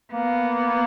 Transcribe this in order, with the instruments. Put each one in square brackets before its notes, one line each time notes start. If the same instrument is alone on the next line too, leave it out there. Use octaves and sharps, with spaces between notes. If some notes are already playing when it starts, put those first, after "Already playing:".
[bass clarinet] A#3 [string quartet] B3